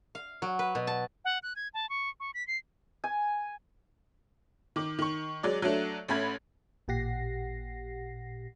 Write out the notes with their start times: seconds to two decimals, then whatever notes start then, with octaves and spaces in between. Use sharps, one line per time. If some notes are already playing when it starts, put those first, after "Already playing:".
0.15 F5
0.42 F#3
0.59 B4
0.75 B2
0.87 A5
1.25 F#5
1.43 F#6
1.56 G#6
1.74 A5
1.89 C#6
2.20 C#6
2.34 B6
2.48 C7
3.04 G#5
4.76 D#3 D6
4.99 D#3 C#6
5.43 F#3 G#3 D5
5.62 F#3 A3 D4
6.08 A1 A3 C#4 B5 G#6
6.88 A1 A#2 G4 F#5 A#6 C7